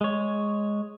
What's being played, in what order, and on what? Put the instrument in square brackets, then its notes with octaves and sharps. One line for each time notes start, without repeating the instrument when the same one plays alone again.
[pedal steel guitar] G#3 C#5